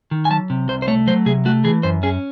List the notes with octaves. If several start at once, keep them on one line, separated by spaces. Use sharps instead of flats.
D#3
G#5
F#3 A5
C3
C2 C5
C5
A3 C#5
F#3 C5
C3 G#4
A3 F#4
E3 G#4
F#2 C5
C#4 G#4